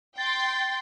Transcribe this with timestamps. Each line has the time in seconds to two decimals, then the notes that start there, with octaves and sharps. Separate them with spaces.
0.18 G5 C6 A6